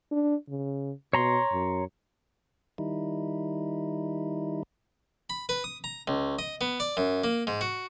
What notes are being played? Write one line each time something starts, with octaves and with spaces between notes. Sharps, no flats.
D4
C#3
B2 C#5 A#5 C6
F#2
D#3 G3 D#4 E4
B5
B4
D#6
A#5
C#2
D#5
B3
D5
F#2
A#3
G#2
F#4